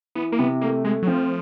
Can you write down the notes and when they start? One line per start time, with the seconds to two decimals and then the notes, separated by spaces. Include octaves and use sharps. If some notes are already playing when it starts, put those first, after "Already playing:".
0.15 E3 B3
0.32 A#3
0.39 C3 B3
0.62 A3 A#3
0.85 G#3 A3
1.03 F#3
1.07 F3 C4